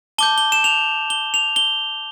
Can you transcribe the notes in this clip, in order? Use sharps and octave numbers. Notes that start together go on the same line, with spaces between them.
A5 D6 G6 G7
G7
E7
F7
G7
F7
G7